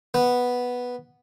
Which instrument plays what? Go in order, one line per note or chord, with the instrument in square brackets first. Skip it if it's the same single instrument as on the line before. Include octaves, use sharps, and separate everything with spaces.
[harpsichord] B3